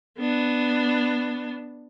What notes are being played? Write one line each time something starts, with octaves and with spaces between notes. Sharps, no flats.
B3 D4